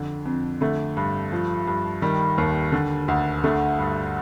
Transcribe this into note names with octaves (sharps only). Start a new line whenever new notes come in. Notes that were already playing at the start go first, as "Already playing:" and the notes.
Already playing: F2 D3
F2
D3 A3
G2
F3
G2
D#3 G3
D#2
D3
D2
D3 A3
G2